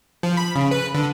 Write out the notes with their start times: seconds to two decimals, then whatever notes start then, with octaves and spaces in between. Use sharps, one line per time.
0.23 F3
0.37 B5
0.56 C#3
0.71 B4
0.94 D3